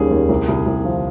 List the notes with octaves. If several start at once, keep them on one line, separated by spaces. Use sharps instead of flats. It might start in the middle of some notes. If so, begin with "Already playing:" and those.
Already playing: D#2 G3 C#4 G#4
D#2
C2
C2
C2
F3